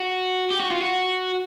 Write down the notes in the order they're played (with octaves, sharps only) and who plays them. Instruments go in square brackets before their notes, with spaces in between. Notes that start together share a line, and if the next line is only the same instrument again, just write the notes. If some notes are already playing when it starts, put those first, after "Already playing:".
Already playing: [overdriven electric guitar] F#4
G4
F#4
F4
F#4